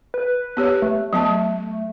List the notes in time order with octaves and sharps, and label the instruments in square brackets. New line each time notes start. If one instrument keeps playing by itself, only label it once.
[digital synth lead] B4
[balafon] B3 G4 C#5
[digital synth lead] A3
[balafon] F#3 B3 A5